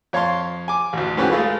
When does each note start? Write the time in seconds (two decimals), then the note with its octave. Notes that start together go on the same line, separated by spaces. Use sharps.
0.13 F2 C#5 F5 A5 C6
0.68 G#5 D6
0.93 A1 D2
1.17 G#2 E3 C#4 F#4 G4
1.30 G#3 A3 F4 A4 B4